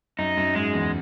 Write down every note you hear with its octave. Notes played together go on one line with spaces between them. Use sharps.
F#2 D#4
F#2
G#2 G#3
E2